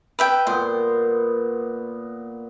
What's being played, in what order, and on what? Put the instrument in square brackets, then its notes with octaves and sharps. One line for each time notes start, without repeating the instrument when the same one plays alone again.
[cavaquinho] B4 E5 G5
[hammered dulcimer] A#2 B3 [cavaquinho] C5